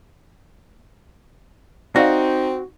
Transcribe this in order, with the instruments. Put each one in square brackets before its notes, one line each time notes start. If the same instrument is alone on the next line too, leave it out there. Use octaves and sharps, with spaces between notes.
[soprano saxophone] C4 [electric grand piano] D#4 [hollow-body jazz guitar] F#4 [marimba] D5 F5